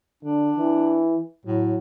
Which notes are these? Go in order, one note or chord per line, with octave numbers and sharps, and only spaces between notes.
D3 D4
E3
A2 F#3